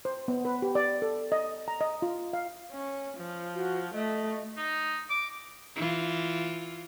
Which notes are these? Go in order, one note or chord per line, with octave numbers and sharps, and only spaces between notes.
C5
B3
B4
G4
D5
A4
D#5
A#5
D#5
F4
F5
C#4
F3
F#4
A3 D#5
D#4
D6
E3 F4